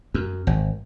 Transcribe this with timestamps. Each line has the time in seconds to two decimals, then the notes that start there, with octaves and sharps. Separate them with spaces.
0.14 F#2
0.47 G#1